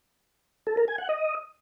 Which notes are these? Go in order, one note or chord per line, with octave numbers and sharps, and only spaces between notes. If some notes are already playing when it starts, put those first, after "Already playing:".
A4
A#4
G#5
F#5
D#5